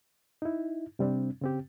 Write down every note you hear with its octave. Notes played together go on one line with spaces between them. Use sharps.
D#4 E4
C3 G3 C4 D4
C#3 C4 G4